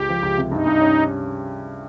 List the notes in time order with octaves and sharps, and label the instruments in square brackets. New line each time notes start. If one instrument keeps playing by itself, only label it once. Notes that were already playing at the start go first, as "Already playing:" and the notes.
Already playing: [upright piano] C#2 [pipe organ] G4
[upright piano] F3
C#2
C3
[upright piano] G2 [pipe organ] D#4
[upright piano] G2
C#4